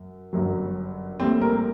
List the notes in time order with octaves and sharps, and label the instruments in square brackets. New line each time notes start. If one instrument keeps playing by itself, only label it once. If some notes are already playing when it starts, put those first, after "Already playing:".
Already playing: [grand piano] F#2
G1 F#2 F#3
A#1 A2 G3 C4
A#4